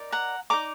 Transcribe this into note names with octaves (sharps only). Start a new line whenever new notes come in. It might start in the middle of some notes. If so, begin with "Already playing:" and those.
Already playing: D#4 A#4 D5
F#5 A#5
D#4 A#4 D5 A#5 D6